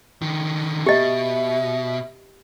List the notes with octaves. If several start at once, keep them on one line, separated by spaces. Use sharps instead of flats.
D3 D#3
B2 G4 D#5 E5